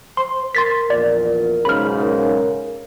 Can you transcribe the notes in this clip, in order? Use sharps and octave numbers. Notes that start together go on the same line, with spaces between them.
C5 C6
A#4 C6 A6 B6
A#1 E2 A#2 D5
B1 G#2 C#3 B5 F6
A#4